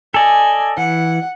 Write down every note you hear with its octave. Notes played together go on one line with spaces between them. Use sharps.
A4 D5 D#5 G#5
E3 F#5